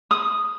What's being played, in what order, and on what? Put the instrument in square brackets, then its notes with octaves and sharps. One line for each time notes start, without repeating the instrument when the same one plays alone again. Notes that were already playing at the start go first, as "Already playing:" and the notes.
[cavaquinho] D#6